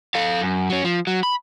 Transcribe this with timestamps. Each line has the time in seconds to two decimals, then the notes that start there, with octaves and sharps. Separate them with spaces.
0.15 A4 F5
0.41 F#2
0.69 F#3 C#4
0.84 F3
1.07 F#3
1.23 B5